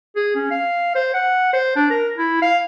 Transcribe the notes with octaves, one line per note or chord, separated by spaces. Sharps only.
G#4
C#4
F5
C5
F#5
C5
D4
A#4
E4
F5